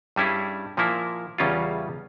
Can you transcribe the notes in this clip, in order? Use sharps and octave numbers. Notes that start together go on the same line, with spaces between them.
G2 G3 C#4 E4 G#4
A#2 F3 A#3 E4
E2 C#3 G3 C#4 F4